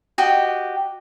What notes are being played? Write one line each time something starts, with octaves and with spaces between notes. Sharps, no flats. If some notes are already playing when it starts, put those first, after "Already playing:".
F#4 G4 D#5 G5